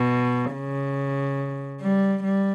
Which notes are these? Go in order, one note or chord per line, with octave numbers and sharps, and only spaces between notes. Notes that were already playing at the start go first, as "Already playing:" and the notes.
Already playing: B2
C#3
G3
G3